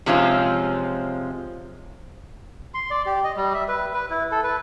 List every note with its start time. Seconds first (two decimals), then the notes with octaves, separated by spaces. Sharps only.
0.06 C3 F3 G#3 C4 C#4 F4
2.74 C6
2.91 D5
3.06 G4
3.24 D#5
3.37 G3
3.54 E5
3.68 B4
3.94 B4
4.10 E4
4.32 A4
4.44 B4